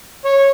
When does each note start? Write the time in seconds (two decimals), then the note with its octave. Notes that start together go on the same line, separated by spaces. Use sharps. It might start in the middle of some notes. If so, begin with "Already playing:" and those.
0.25 C#5